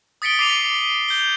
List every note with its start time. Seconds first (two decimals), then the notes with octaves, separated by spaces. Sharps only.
0.22 D#6 A6 B6 C#7 D7 G7
0.39 D6 B6 C7 D#7 F7 G7
1.08 G6 G7